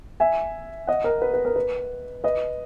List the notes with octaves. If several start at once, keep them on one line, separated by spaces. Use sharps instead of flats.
E5 G#5
D#5 F#5
A#4
B4
B4
A#4
B4
B4 D#5